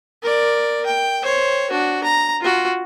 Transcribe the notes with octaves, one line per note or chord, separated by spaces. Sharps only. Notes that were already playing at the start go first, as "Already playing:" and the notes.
A#4 D5
G5
C5 C#5
D4 F#4
A#5
F4 F#4